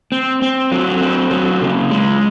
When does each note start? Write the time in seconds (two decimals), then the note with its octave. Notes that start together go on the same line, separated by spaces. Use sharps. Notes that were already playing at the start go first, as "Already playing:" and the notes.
0.12 C4
0.42 C4
0.72 F#3
1.01 C4
1.31 F#3
1.61 C#3
1.91 G#3